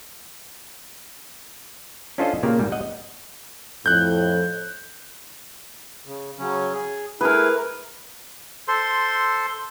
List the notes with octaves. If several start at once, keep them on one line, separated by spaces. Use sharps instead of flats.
C#4 D4 F4 A4 C5 D#5
A#2 C#3 A#3 G4
G#2 G3
D#5 F#5
F2 A2 F#6 G6
C#3
C#3 F#3 C#4
G#4
A3 E4 G#4 A#4 B4
A4 C5 C6